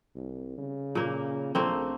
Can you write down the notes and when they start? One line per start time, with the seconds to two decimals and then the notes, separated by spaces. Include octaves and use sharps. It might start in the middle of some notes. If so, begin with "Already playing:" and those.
0.16 C2
0.58 C#3
0.95 A#2 A#3
1.55 A#1 A3 A#3 C4